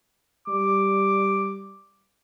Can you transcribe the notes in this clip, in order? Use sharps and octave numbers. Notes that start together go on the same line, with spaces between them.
G3 D6